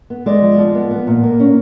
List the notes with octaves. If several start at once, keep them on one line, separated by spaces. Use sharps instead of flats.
B3
G#3 D5
F3
F3
B3
B3
A#2
A#3
C#4